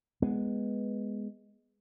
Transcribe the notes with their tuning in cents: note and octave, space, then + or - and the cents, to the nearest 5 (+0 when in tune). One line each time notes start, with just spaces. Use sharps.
G#3 +0 B3 +0